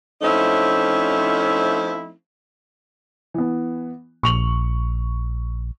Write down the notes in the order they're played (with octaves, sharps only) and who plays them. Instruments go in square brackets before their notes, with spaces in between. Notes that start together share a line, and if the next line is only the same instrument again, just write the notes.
[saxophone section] F3 A3 C4 C#4 D#4 E4
[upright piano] E3 B3
[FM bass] A#1 [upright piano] C#6 F7 F#7